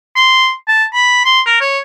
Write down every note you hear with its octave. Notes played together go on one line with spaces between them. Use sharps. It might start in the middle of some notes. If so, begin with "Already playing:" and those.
C6
A5
B5
C6
A#4
C#5